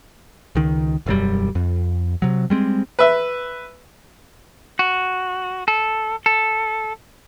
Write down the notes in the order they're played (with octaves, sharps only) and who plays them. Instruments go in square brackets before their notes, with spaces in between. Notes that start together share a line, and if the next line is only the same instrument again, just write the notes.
[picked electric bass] C#2 D#3
E1 F#2 G3
F2
C3 F#3
G3 G#3 C4
[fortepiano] B4 E5
[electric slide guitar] F#4
A4
A4